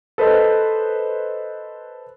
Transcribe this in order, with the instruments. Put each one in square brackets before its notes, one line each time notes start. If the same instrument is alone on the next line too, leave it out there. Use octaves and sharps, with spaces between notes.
[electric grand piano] A4 B4 C5 D#5